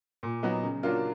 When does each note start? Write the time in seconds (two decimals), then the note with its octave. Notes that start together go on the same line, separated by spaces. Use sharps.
0.23 A#2
0.43 F#3 B3 D#4
0.63 C#3
0.83 F#3 A#3 D4 F4